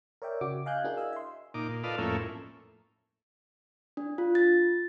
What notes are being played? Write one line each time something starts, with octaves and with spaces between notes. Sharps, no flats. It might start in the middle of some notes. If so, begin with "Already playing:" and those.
A#4 C#5 D5 E5 G5
C#3 F#4 D6
D#5 F5 G#5 F#6 G6
D4 E4 F#4 G#4 A#4
D#5 F5 G#5 E6
E5 C6
A#2 D#4 D6
A#2
F4 A4 B4 D5 D#5 F5
F2 A2 A3 A#3 C#4 E4
D4
F4
A6